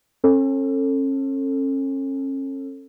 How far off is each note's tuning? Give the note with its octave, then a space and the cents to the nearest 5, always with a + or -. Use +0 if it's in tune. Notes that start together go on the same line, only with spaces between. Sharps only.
C#4 -40 A4 +20